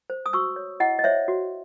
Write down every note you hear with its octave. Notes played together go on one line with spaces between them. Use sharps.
C5
D#6
F#4 C#6 E6
C#5
E4 D#5 F#5
D#5
C5 C#5 E5
F#4